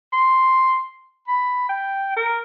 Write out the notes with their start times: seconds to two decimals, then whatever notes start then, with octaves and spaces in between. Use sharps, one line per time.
0.13 C6
1.28 B5
1.69 G5
2.17 A#4